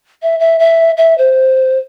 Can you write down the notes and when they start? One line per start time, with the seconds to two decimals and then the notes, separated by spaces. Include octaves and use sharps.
0.22 E5
0.39 E5
0.59 E5
0.97 E5
1.18 C5